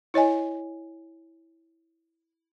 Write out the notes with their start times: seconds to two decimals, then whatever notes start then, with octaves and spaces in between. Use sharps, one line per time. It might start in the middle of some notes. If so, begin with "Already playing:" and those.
0.14 E4 C#5 D#5 G#5